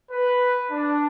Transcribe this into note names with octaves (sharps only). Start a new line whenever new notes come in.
B4
D4